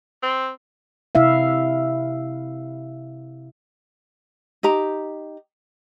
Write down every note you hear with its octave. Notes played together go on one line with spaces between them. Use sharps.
C4
C3 E4 E5 F5
D#4 G4 A#5